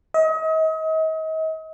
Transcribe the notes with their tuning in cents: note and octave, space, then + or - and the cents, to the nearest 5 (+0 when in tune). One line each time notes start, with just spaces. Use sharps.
D#5 +40